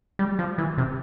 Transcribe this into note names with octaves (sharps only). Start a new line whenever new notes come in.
G3
F3
E3
C3